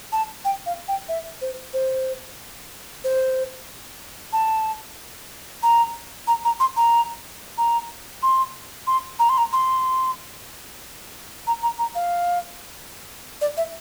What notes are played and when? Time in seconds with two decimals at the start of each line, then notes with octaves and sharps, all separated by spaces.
0.12 A5
0.45 G5
0.66 F5
0.88 G5
1.09 E5
1.41 C5
1.73 C5
3.04 C5
4.33 A5
5.63 A#5
6.27 A#5
6.45 A#5
6.60 C6
6.76 A#5
7.58 A#5
8.23 C6
8.87 C6
9.19 A#5
9.29 C6
9.38 A#5
9.53 C6
11.47 A#5
11.63 A#5
11.79 A#5
11.95 F5
13.41 D5
13.57 E5